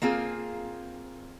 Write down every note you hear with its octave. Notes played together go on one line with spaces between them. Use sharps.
A#3 C4 F4 G#4